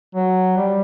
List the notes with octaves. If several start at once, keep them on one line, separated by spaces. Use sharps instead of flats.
F#3
G3